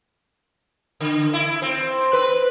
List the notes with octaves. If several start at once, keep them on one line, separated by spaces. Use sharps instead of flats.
D3
E4
C4
B4